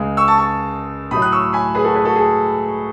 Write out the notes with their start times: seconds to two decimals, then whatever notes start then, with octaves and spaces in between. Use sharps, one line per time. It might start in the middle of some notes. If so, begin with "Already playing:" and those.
Already playing: C#2 C#3 G#3
0.17 C#6 E6
0.28 A5 C#6
0.38 A5 C#6
1.11 A2 F#3 A3 B5 D#6
1.22 D#6 F#6
1.32 C#6 E6
1.53 G#5 B5
1.75 G#4 B4
1.84 F#4 A4
1.95 G#4 B4
2.05 F#4 A4
2.16 G#4